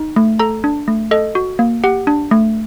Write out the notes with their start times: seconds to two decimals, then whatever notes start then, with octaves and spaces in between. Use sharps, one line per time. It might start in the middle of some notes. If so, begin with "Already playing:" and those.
Already playing: D#4
0.16 A3
0.39 A4 A#5
0.64 D4
0.88 A3
1.11 A4 D#5
1.35 F#4
1.59 A#3
1.84 G4 F#5
2.07 D4
2.31 A3